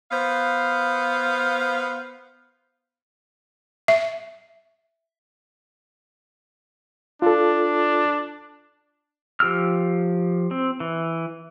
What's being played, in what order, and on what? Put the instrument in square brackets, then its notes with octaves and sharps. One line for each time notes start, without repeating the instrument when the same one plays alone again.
[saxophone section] B3 C5 F5
[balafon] E5
[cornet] D4 [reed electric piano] F4 A4
[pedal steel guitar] F3 G4 E6 F6
C4
E3